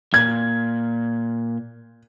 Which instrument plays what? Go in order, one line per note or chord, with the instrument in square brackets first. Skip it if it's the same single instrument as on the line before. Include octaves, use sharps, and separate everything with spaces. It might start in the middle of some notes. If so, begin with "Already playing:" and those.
[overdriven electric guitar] A#2 [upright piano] G#6